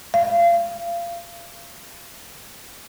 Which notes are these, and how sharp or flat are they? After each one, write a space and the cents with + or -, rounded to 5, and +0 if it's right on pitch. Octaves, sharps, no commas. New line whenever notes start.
F5 -25